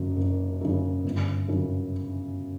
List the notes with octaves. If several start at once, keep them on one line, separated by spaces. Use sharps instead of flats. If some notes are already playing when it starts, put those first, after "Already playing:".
Already playing: F#1 F#2 C#3
F#1
F#2 C#3
G1
F#2 C#3